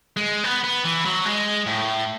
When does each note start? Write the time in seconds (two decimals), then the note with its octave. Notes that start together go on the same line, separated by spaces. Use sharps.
0.17 G#3
0.44 B3
0.64 B3
0.84 E3
1.05 F#3
1.25 G#3
1.66 A2